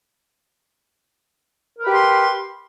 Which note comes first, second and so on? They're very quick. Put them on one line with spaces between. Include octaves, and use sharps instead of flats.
A#4 B4 G4 C6